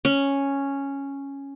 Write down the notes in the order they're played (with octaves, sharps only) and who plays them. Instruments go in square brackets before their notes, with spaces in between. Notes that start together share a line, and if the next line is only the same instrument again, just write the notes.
[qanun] C#4